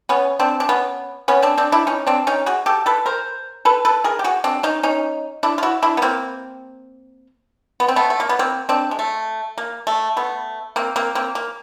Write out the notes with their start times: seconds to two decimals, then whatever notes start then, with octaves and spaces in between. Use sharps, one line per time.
0.09 B3 C#4
0.39 C4 D4
0.60 D4
0.69 B3 C#4
1.28 B3 C#4
1.42 C4 D4
1.57 C4 D4
1.72 D4 E4
1.87 C#4 D#4
2.07 C4 D4
2.27 C#4 D#4
2.46 F#4 G#4
2.66 G4 A4
2.86 A4 B4
3.06 A#4 C5
3.65 A4 B4
3.85 A4 B4
4.04 G#4 A#4
4.19 G4
4.24 F#4 G#4
4.44 C4 D4
4.63 C#4 D#4
4.83 C#4 D#4
5.43 D4 E4
5.58 F4
5.63 E4 F#4
5.82 D4 E4
5.97 B3
6.02 A#3 C4
7.80 B3
7.88 C4
7.96 A3 B3
8.10 A3
8.20 A#3
8.29 B3
8.39 A#3 C4
8.69 C4 D4
8.91 G#3
8.99 A3
9.58 A#3
9.87 A3
10.17 A3 B3
10.76 A#3 C4
10.96 A#3 C4
11.15 A#3 C4
11.35 A#3